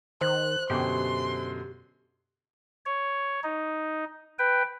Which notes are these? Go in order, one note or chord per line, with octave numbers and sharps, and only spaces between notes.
D#3 C5 F#6
F#2 B2 D3 G4 C6
C#5
D#4
B4 G5